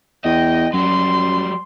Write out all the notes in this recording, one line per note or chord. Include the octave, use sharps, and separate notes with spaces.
E2 D#5 G5
F#2 F#3 G3 C6